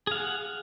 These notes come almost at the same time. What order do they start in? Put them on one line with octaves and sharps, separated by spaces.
G#4 F5 F#5